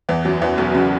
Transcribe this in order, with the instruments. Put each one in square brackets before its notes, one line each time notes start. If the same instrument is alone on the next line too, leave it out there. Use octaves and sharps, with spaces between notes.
[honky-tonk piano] E2 E3
F#2 F#3
E2 E3
B1 B2
C#3